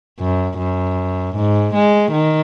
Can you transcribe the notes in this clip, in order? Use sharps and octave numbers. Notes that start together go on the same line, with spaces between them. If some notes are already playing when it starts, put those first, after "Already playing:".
F#2
F#2
G#2
G#3
D#3